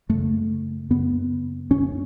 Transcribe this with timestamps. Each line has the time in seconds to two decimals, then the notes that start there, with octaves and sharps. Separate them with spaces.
0.09 F#2 C#3 A3
0.90 F#2 C#3 B3
1.70 F#2 C#3 C#4